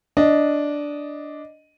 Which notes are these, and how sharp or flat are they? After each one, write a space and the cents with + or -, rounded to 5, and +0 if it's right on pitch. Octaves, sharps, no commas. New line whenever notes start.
D4 -5 D#5 +0